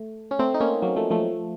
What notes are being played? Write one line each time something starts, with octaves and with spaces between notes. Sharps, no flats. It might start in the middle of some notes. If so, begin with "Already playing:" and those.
Already playing: A3
C#4
A3 C4
D#4
A#3 C#4
F#3 A#3
F3 A3
F3 A3